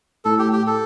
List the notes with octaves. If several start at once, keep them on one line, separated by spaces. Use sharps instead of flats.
A2 A4
G4
G4
A4